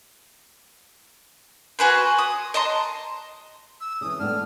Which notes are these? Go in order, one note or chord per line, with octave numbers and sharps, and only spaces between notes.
F#4 G#4 B4 C5
D#6
D#5 A5 A#5 C6
E6
C#3 E3 D#6
A2 B3 D4 F6